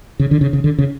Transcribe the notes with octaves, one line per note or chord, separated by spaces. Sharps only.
C#3
D3
C#3
C#3
D3
C#3